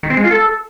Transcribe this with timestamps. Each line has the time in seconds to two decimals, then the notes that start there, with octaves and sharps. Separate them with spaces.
0.03 D#3
0.10 C4
0.17 G#3
0.24 F4
0.31 A4